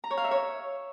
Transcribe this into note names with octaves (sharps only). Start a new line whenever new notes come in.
A#5
C#5
F5
E5
C#5